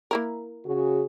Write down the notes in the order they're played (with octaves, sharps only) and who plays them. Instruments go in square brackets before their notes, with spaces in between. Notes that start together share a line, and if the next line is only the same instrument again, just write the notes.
[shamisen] A#3 E4 A#4
[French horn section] C#3 F#4 G#4